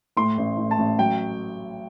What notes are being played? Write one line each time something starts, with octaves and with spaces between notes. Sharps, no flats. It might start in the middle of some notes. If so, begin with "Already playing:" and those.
A2 C6
A1
A2
A5
A1
F#3 G5